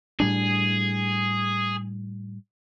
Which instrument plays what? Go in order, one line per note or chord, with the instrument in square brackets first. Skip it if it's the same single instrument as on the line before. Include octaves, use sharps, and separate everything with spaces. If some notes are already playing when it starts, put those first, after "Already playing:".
[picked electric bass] A2 G3 D4 [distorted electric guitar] G#4